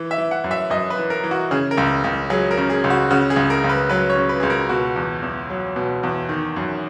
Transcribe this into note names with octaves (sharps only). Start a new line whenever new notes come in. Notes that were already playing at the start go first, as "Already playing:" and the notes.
Already playing: E3
E5
E3
F#5
F#2
E5
F#2 D#5
B4
E3
A#4
E3
F#4
C#3 G#4
A#4
C#2
C#2
F#3 G#4
A#4
C#3
G#4
C#2
F#4
C#3 F#4
G#4
C#2
A#4
C#2
B4
F#3 B4
C#5
C#3
B4
C#2 G#4
A#4
B2 F#4
E2
E2
F#3
B2
E2
D#3
F#2